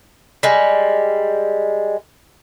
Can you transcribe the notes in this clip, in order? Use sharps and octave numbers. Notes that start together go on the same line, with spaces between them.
G3 G#3